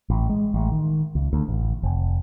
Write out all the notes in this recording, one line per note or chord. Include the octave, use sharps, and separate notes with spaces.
A1
G#3
A1
D#3
C#2
D2
A1
F1